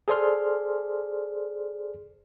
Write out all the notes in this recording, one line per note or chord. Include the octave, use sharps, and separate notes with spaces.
G#4 A4 C5 D5 C6 F6